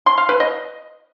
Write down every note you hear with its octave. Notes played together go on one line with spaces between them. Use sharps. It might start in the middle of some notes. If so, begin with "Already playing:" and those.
C6
F5
B4
D#5